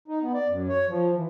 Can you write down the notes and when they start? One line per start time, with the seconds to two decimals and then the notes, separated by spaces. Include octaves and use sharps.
0.08 D#4
0.22 B3
0.34 D5
0.49 F#2
0.69 C#5
0.88 F3
1.15 E3